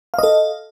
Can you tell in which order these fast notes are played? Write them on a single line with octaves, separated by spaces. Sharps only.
F5 D#5 A4